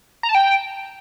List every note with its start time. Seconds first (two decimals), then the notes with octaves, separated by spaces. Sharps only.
0.23 A#5
0.29 A5
0.35 G5